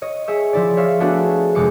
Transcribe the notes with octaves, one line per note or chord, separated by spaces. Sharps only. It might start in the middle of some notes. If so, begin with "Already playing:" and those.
C#5 D#5
G#4 C#5 E5
F3 E4 D5
C#5 E5 F5
A3 B3 D4 F#4 G#4
F1 G#3 D6 C#7